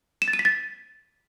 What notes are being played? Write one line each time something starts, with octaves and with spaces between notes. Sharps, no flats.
E7
A6
D#7
B6
A6